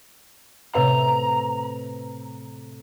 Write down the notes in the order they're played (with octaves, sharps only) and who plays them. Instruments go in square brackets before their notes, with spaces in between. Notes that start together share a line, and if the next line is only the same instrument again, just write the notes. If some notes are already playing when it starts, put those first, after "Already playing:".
[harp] A2 C3 E5 [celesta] B4 [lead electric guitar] A#5